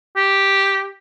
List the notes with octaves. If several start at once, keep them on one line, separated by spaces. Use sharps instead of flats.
G4